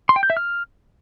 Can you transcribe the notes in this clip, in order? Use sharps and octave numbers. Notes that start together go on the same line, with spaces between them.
C6
G5
G6
E5
F6